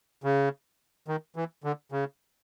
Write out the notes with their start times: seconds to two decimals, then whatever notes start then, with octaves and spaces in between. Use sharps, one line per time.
0.24 C#3
1.08 D#3
1.36 E3
1.64 D3
1.92 C#3